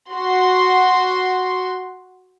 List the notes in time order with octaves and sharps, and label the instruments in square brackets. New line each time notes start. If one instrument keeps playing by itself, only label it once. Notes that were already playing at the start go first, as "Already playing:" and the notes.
[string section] F#4 C6